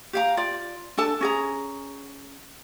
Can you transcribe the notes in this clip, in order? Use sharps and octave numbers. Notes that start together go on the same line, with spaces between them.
G4 F5 A#5
F4 D5
D4 A4 A5
C#4 G#4 A#5